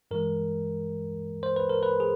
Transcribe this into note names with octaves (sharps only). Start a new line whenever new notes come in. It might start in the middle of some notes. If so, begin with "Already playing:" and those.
G2 E3 G#3 A#4
C5
B4
A#4
B4
G#4